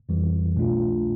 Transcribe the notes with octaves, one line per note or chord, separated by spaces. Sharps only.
F2 E3 G3
C2 B2 A3 D4 F4